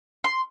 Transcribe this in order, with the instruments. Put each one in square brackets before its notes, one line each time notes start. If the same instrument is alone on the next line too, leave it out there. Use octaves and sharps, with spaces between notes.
[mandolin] C6